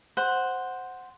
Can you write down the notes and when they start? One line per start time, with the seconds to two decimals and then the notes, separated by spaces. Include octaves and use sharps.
0.17 C5 F#5